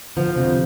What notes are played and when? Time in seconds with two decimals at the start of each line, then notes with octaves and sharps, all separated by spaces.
0.16 D3 F3
0.36 F2 C3